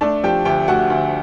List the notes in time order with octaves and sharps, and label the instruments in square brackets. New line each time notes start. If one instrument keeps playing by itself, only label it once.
[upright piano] A3 D4 D5
F3 G4 G5
D2 G4 G5
A3 F#4 F#5
D2